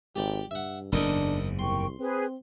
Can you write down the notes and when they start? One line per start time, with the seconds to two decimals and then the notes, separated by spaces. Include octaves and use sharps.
0.16 G#1 G4 D5 G5
0.51 G2 E5 F#5
0.92 F#1 E2 G#2 D4 A4 A#4 D#5
1.59 C2 A#4 G5 C6 C#6
1.99 C4 G#4 B4 C5